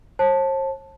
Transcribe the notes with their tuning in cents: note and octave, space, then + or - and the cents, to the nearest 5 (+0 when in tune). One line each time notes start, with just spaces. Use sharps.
C5 +45 A5 +0